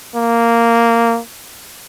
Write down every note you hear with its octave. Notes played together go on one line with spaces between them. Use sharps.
A#3